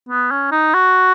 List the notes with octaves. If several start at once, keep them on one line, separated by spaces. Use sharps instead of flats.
B3
C#4
D#4
F#4